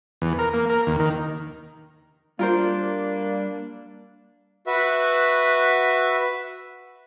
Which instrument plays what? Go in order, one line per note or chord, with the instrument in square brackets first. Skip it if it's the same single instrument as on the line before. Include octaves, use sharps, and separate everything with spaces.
[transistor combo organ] E2
A#4
A#3
A#4
D#2
D#3
[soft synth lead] G3 [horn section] A#3 D4 [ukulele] F4 A#4 C5
[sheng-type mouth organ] F#4 B4 E5